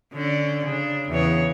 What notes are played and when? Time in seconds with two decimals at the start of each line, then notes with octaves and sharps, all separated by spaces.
0.14 D3 C#4 D5
0.66 C#3 D4
1.09 E2 C#3 C#5